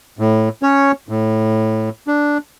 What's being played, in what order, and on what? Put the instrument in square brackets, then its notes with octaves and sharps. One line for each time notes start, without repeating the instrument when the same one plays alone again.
[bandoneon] A2
C#4 C#5
A2
D4